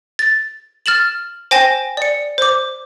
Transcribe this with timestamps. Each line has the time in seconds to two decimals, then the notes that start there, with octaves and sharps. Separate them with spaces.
0.19 A6
0.86 F6 A6 E7 F#7
1.51 C5 G5 G#5 A#6 E7
1.97 D5 C#7
2.38 C5 D6